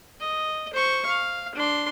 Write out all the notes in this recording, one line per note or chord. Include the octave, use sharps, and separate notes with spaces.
D#5
C5 C#6
F5
D4 C6